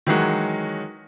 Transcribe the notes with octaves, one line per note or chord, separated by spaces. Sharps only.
D#3 E3 F#3 G#3 F#4